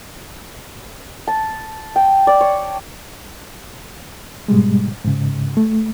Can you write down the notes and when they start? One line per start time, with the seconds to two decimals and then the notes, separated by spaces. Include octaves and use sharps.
1.28 A5
1.96 G5
2.27 D5
2.41 C#5
4.48 G#2 B2 G3 G#3
5.04 G#2 C#3
5.57 A3